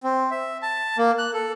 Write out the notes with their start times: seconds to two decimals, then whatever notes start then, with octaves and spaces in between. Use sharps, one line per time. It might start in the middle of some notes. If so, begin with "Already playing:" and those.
0.03 C4
0.31 E5
0.63 A5
0.98 A#3
1.18 F#6
1.34 A4